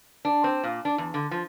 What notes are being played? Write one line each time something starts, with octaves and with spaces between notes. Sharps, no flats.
D4
C4
A#2
D4
E2
D3
F3